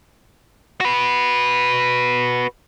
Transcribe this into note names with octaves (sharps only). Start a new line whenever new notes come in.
F#4 B4